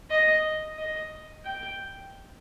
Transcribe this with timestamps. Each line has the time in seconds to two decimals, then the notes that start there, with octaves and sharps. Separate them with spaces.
0.10 D#5
0.78 D#5
1.44 G5